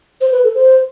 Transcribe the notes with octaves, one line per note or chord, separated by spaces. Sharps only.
C5
B4
A4
C5